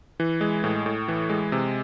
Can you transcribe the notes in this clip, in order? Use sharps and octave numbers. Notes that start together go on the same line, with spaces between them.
E3
G#3
A2
A2
E3
G#3
C3